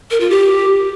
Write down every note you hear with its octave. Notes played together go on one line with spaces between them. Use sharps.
A#4
F4
G4